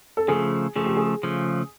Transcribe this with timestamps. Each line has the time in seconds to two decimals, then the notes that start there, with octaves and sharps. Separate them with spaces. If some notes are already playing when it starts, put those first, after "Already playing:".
0.17 A4
0.28 C#3 F3 A3 G#4
0.76 C#3 F3 A3 G#4
0.86 G4
0.97 G#4
1.23 C#3 F3 A3